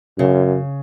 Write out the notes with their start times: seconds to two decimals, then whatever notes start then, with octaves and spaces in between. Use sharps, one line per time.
0.18 F#2 C#3